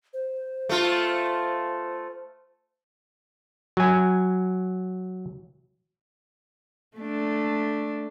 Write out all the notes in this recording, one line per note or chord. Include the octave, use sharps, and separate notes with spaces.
C5
A3 F4
F#3 G#5
A3 D4